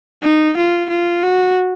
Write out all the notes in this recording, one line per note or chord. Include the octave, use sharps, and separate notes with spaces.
D#4
F4
F4
F#4